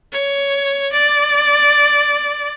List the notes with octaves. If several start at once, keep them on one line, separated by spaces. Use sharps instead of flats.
C#5
D5